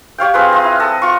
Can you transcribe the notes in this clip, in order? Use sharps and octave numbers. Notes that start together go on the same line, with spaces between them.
G4 C#5 F5 G5
C4 F4 G#4 B4
F4 D#5
E4
A4 D#5
F4 C#6